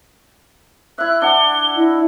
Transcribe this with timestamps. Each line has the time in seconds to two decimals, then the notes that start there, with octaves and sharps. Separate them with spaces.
0.98 E4 E5 F#6
1.22 D4 F#5 G7
1.76 E4 D#5